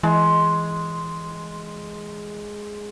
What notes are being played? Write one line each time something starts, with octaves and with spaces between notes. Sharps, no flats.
E3 G#3